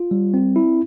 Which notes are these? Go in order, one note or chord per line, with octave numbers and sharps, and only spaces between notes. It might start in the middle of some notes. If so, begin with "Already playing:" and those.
Already playing: F4
G3
C4
E4